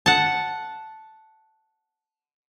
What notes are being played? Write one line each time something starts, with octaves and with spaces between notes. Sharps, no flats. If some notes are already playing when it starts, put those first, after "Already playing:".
F#5 A5